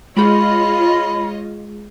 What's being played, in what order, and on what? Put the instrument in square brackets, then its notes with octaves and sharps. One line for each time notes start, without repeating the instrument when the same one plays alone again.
[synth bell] G#3 G#4 [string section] F4 C#5 D#5 [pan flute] B5